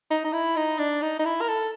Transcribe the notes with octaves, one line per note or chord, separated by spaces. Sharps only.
D#4
D#4
E4
D#4
D4
D#4
D#4
E4
A#4
A4